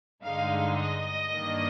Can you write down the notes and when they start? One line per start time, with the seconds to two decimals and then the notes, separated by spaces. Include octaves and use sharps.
0.23 G2 D3 G#3 D#4 F5
0.77 D#5
1.32 G2 D#3 A#3 D4